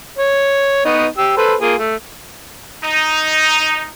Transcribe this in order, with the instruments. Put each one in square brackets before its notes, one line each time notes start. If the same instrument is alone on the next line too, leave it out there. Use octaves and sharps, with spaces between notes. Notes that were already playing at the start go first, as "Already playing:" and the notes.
[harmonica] C#5
B3 D#4 C#6
G4 E6
A4 B4 C5
A#3 F4 G#4
A3
[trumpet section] D#4